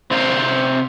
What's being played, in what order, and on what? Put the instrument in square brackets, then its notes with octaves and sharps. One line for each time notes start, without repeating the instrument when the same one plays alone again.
[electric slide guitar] C3 C4 C5 F5 A5 A#5